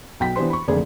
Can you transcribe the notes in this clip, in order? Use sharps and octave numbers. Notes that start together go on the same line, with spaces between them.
B1 G5 B6
E3 B3 D4 G4 C5 C6
B5 C#6
F#1 F2 D3 A3 G#4 D5